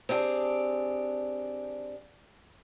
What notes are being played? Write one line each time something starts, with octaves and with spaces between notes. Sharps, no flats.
C4 D4 G4 G#4